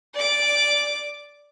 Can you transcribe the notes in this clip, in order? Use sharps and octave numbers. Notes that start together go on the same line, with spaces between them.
D5 D6